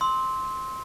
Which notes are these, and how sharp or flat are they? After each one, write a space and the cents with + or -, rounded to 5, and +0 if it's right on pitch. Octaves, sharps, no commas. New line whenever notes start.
C6 +5 E6 -35